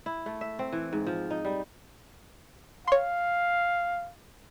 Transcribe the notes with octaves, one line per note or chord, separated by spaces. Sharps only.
E4
A3
E5
C4
E3
G#2
F3
D#4
G3
C#5 F5 C6